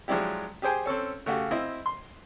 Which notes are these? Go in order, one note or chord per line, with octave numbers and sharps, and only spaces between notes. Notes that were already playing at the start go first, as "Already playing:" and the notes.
F3 F#3 G#3 D4 E4 G4
G4 G#4 C5 G5 G#5
C4 C#4 A4 C#5
C#3 A3 F#4 G4
C4 E4 D#5
C6